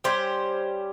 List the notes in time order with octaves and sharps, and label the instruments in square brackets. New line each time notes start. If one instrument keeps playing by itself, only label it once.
[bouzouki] G3 C#4 G4 C5